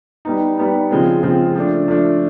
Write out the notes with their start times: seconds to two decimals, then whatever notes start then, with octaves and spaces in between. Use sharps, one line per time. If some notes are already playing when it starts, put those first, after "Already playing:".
0.25 G3 B3 D#4
0.58 G3 B3 D#4
0.90 C#3 F3 G#3 C4 F4
1.23 C#3 F3 G#3 C4 F4
1.55 F3 A3 D4
1.88 F3 A3 D4